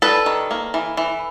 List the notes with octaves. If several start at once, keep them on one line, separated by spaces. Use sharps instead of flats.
G3 A4 B4
D#3
A#3
E3
E3